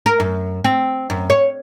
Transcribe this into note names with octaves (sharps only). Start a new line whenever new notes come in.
A#4
F#2
C4
F#2
C#5